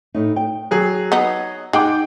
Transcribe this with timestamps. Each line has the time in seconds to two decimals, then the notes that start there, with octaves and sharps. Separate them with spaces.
0.14 A2 D#4
0.36 G5
0.71 F#3 G#4
1.12 B3 D#4
1.73 G#3 D#4 F#5 G5 D6